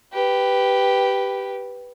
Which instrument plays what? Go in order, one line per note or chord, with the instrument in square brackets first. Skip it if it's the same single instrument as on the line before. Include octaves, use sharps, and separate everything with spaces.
[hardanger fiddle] G4 B4